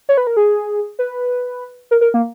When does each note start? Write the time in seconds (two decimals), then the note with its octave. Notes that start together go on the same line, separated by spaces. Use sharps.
0.09 C#5
0.17 B4
0.27 A#4
0.37 G#4
0.99 B4
1.91 A#4
2.01 A#4
2.14 A#3